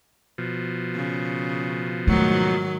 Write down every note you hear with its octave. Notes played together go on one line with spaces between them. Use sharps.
B2 F3
C#3
G#2 D#3 F#3 A3